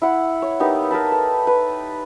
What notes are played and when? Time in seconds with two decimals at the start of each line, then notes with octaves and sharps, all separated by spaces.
0.02 E4 F#5
0.42 C#5
0.60 A#3 B3 D#4 G4
0.91 A#4 B4 A5 B5
1.12 A4
1.47 B4